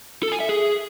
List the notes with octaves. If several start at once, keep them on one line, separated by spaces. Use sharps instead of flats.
A4
G#5
E5
G#4